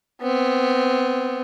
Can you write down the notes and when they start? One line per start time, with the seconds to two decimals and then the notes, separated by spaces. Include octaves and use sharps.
0.21 B3 C4